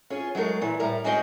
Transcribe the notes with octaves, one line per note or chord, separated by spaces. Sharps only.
C#4 F4 G#4
F#3 G#3 A3 A#4
A#2 E3
A2 G3 A#4 A#5
G#3 C#4 F#4 G#4 D#5 G5